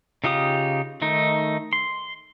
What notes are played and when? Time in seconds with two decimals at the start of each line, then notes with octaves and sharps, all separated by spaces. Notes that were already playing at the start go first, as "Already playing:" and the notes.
0.24 C#3 D#4 F4 G4 D#6
1.02 D#3 A3 D#4
1.73 C6